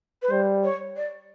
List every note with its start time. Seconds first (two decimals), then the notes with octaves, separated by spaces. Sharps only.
0.22 B4
0.30 G3 C5
0.63 C#5
0.96 D5